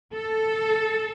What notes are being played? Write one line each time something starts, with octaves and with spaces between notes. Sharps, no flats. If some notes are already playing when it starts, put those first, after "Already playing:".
A4